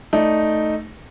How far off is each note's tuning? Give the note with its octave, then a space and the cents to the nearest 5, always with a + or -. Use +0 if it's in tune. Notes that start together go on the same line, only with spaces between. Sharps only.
A3 +0 D#4 +0 D5 +0